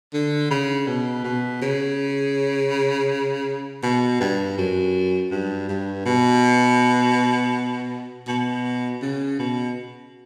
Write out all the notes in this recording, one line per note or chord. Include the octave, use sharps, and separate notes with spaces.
D3
C#3
B2
B2
C#3
B2
G2
F#2
G2
G2
B2
B2
C#3
B2